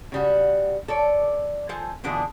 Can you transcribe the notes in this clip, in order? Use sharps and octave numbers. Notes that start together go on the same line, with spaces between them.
C#3 G3 F#4
A4 C#5 D5
F3 A4 C5 G#5
B2 D3 E3 D4 F4 G#4